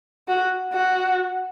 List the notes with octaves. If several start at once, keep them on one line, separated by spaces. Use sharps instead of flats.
F#4
F#4